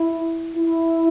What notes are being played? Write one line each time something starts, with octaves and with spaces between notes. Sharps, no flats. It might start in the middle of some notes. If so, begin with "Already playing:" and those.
Already playing: E4
E4